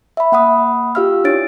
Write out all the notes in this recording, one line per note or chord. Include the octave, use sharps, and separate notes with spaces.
E5 B5
A#3 F#5 B5 D#6
F4 G4 F5 E6 F6
D4 E4 C#5 A6 D7